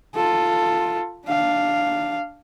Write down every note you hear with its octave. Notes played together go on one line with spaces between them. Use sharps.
F4 A4
D4 F5